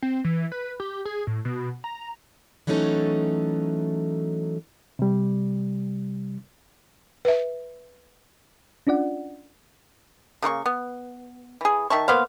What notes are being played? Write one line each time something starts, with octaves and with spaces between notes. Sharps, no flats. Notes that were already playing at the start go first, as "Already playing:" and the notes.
C4
E3
B4
G4
G#4
A2
B2
A#5
E3 F#3 A3 C#4 D#4 A4
C3 G3
B4 E5
C#4 D4 F4 D5 F#5
C#3 A#3 F4 C#6
B3
E3 G#4
D#3 E5 A5 C#6
A#3 B3 C5 F5